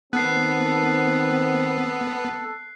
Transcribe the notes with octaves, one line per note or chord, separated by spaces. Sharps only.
D#3 B3 C4 A4 F#6 C7